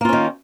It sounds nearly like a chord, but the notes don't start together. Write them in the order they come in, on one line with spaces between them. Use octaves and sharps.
A#3 F4 C#4 D#3